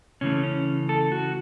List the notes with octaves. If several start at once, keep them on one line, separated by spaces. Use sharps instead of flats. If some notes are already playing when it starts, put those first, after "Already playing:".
C#3 E3 A3 C#4
C#4
A4
F#4